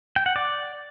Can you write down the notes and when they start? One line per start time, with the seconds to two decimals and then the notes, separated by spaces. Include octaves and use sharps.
0.16 G5
0.26 F#5
0.36 D5